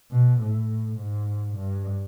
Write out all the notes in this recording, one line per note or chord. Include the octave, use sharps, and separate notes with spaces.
B2
A2
G#2
G2